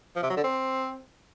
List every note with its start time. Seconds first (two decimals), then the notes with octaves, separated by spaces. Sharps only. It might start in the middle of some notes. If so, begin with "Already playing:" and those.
0.16 F3
0.23 C3
0.30 F#3
0.37 D3
0.44 C4